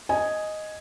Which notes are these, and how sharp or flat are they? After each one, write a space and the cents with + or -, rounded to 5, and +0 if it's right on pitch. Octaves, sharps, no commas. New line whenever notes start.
D#5 +0 G#5 +0